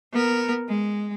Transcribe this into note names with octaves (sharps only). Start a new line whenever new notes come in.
B3 A#4
G#3